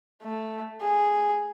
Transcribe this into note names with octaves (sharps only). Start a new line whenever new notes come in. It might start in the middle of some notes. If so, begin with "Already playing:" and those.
A3
G#4